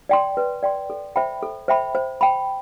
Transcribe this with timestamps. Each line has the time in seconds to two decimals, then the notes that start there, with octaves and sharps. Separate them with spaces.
0.09 D5 G5 C6
0.37 B4
0.63 D5 G5 C6
0.90 A4
1.16 C5 E5 G5 B5
1.43 A4
1.68 C5 E5 G5 B5
1.95 C5
2.21 G5 B5